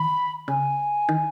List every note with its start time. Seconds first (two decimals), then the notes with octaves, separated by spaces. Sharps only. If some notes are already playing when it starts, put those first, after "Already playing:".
Already playing: D#3 B5
0.48 C#3 G#5
1.09 D#3